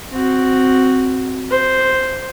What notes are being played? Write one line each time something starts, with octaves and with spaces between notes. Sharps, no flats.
C4 F#4
C5